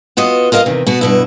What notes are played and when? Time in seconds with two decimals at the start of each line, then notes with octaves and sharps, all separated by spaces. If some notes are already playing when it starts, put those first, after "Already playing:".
0.17 B3 F4 F#4 D#5
0.52 F4 A#4 D#5 F5
0.66 E2 C3 D#3
0.86 B2 B3 F#4
1.01 G2 B2 E4